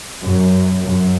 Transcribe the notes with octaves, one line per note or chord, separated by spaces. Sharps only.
F#2
F#2